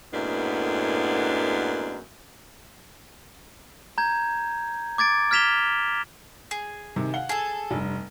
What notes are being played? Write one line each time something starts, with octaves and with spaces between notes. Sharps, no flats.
F#2 A2 G#3 A#3 B3 D4
A#5 G6 G#6
D6 G#6 A6 D7
F6 G#6 B6 E7 F7 G7
G#4
C3 D#3
F5 F#5 G7
G#4 A4 A5
F1 G2